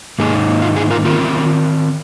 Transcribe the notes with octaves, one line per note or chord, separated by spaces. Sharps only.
G#2 D#3 A#3 D#4 G#4
F4
G#4
F4 A#4
D#3 C4 F4 A#4